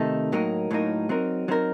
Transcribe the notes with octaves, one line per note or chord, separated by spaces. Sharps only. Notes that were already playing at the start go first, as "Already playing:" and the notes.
Already playing: C3 D#3 A3 D#4 A4
A2 F#3 A#3 D#4 A#4
A2 F#3 A#3 D#4 A#4
F#3 C4 D#4 A#4
F#3 C4 D#4 A#4